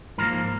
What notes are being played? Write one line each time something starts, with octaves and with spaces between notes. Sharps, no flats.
G#2 F3 A#3 A#4